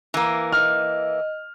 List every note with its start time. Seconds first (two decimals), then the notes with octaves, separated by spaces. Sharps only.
0.14 E3 A#3
0.52 D#5 F6